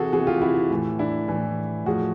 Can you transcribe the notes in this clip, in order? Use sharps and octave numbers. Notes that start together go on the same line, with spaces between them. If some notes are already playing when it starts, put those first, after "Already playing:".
Already playing: C3 E3 F#4 G#4 A4
C3 E3 F#4 G#4
F4 G4
E4 F#4
A2 E3
D4 E4
A2 E3
A2 F3 F#4 G#4